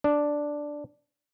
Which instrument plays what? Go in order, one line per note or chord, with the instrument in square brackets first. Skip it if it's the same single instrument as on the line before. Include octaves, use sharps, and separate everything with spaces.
[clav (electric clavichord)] D4